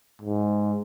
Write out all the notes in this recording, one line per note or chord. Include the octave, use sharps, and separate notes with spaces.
G#2